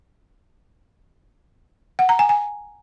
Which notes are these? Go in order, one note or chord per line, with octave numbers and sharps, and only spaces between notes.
F#5
A#5
G#5
G#5